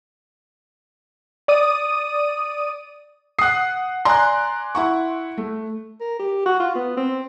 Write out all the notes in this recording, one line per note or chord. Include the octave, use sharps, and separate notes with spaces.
D5 D#6 D#7
F#5 D#6 F#6 C7
D5 G#5 A#5 C6 F#6
E4 F#5 C#6
A3
A#4
G4
F#4
F4
B3
C4